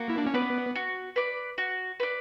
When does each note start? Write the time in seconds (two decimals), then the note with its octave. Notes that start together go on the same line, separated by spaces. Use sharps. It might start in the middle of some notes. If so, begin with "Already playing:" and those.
Already playing: A#3 F#4
0.10 E4
0.18 D4
0.26 C#4
0.34 B3 B4 D5
0.75 F#4
1.16 B4 D5
1.58 F#4
2.00 B4 D5